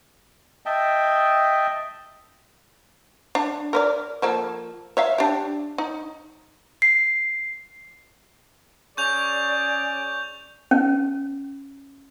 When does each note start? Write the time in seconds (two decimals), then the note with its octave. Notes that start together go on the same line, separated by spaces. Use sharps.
0.66 D#5 E5 G5 A5
3.35 D4
3.73 A#4 B4 D5
4.22 F3 A#3 A4
4.97 C#5 E5 F5
5.18 D4 G4
5.78 D#4
6.82 C7
8.97 C#4 G#4 D5 C#6 G6 F7
10.71 C#4